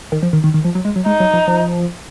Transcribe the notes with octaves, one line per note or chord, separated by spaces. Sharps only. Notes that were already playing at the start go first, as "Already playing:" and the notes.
D#3
F3
D#3
D#3
D#3
F3
F#3
G#3
F#3
G#3 D#4
F#3
F3
F3